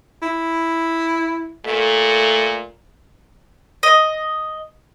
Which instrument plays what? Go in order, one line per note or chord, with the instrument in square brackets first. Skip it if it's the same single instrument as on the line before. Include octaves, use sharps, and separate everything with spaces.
[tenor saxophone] E4
[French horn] A#2 [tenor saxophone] A3
[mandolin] D#5